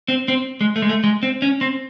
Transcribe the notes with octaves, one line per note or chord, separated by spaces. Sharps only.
C4
C4
G#3
A3
G#3
A3
G#3
C4
C#4
C4